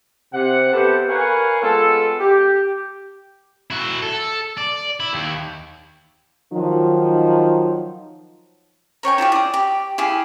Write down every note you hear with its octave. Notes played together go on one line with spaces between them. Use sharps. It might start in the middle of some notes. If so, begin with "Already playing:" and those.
C3 F#5
B3 G4 A4 B4 C5 F#5
A#4 B4 C#5 F5 F#5 G#5
G#3 B3 F4 A4
G4
E4 F#4
A4
D5
E4
D#2
D#3 F3 F#3 D#4
A#4 C#5 G5 G#5
E4 F4 G4 F5
D5 D#6
G4
E4 G4 G#4 F5